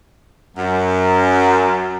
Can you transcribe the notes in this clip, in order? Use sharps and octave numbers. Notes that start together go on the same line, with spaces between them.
F#2